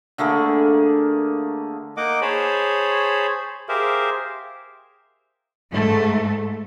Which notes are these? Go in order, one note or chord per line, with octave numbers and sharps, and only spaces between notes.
D3 A3 A#3 G#4
A#3 D#4 D#5 F#5 D6
G#4 C5 C#5 G#5 A5 B5
G4 G#4 A#4 C5 E5 F5
G#2 A3